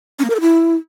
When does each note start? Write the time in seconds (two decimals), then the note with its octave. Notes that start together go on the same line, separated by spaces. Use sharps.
0.19 C#4
0.24 A#3
0.30 A#4
0.35 A4
0.40 E4